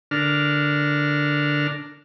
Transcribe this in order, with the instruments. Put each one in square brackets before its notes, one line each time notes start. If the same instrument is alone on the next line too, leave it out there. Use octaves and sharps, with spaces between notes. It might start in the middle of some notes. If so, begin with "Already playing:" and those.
[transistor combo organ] D3 D4 A#4 F6